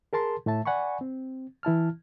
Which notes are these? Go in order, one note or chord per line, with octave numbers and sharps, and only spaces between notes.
G#4 A#4 A5 C6
A2 A3 E5 A5
D5 F#5 G#5 B5 C#6
C4
E3 E4 A5 F6